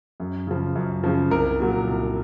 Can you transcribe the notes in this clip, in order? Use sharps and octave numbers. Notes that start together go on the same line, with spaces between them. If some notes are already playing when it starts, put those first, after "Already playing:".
F#2
C#3 F3
F#2
C#3 F3
C2 A#4
A#2 F#3
C2